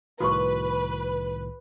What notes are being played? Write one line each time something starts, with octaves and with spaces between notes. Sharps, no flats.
C2 A2 D#3 F#4 B4 C#6